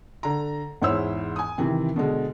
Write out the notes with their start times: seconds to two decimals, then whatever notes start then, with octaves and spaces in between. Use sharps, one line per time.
0.23 D3 A#5
0.82 E2 G#2 E4 C5 C#5 E6
1.36 G#5 D#6
1.58 C3 D#3 E3 C4
1.96 B2 D3 G#3